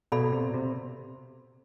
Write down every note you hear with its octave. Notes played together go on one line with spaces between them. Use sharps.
B2 A4 D5 F5 B5
C3
C3